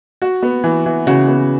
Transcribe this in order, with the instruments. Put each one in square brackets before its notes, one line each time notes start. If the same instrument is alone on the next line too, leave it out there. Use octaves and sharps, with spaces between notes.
[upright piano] F#4
B3
E3
E3
[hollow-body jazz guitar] C#3 [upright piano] F#4
[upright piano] B3